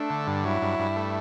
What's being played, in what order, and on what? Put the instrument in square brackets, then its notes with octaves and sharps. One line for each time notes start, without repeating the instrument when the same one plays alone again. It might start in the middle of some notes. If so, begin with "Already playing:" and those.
Already playing: [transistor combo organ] A3 [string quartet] D4
[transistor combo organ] D3
G2
[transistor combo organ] F#3 [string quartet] E4
[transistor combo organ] G2
G2
A3